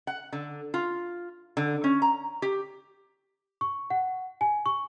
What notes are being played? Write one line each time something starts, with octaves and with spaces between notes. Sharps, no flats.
F#5
D3
F4
D3
C#4
A#5
G4
C#6
F#5
G#5
C#6